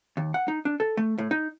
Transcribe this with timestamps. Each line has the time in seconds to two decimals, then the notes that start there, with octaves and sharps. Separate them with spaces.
0.17 D#2
0.34 F#5
0.48 D#4
0.65 D4
0.80 A4
0.97 A3
1.18 A2
1.31 D#4